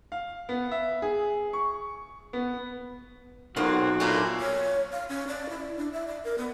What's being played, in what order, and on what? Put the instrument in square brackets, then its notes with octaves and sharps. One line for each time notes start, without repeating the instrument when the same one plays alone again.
[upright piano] F5
B3
E5
G#4
C#6
B3
[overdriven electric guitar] B1 [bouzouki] A#3 C4 F4 [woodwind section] F#4
[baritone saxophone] A#2 [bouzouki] D4 E4 F4
[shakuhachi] C#5
F5
C#4
D5
E4
D4
E5
D5
A#4
B3